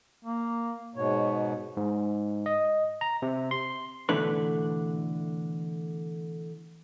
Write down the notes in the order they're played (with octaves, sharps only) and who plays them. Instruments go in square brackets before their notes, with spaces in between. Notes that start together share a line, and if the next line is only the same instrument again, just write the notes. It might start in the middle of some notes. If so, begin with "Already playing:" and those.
[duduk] A#3
[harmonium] G#2 B2 [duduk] C#5
[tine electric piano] G#2
D#5
A#5
C3
C6
[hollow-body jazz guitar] B2 D3 E3 A3 D4 B4